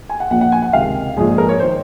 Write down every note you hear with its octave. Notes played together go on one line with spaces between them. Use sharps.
G#5
F#5
A#1 A#2 F3 F#5
F#5
G#5
F#5
C#2 C3 D#3 F5
A#1 G#2 F3 G#4
G#4
A#4
C#5
D#3 C5